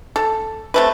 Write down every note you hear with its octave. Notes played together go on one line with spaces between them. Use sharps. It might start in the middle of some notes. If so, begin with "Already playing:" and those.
A4
C3 A3 B4